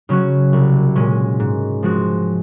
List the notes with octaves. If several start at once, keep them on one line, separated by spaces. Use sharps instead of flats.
C#3 F#3 C#4 F#4
C2
A#2 G#3 C#4
G#2
F3 G#3 C4 F#4